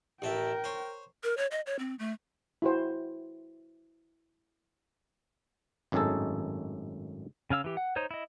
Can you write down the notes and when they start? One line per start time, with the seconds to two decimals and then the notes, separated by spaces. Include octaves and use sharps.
0.22 A1 A4 A#4 E5 G5
0.64 C5 C#5
1.23 A#4
1.38 C#5
1.51 D#5
1.67 C#5
1.79 C4
1.99 A3
2.62 E4 F#4 C5
5.92 G#1 F#2 A2 D#4 G#4 A4
7.50 C#3 C#4 F5 E6
7.64 E3 G4
7.77 F#5
7.96 D#4 C5 C#5
8.11 E4 D#5